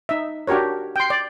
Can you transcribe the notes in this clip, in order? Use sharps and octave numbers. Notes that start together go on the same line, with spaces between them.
D#4 E5
D4 F#4 G4 A#4 C#5
G5 C6
D5